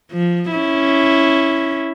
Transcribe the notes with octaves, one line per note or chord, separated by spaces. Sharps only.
F3
C#4 E4